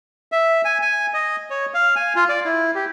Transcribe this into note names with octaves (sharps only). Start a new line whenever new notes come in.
E5
G#5
G#5
D#5
C#5
F5
G#5
F4
D5
E4
G4